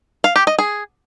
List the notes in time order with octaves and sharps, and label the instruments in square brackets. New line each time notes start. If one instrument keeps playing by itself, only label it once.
[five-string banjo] F5
G4
D#5
G#4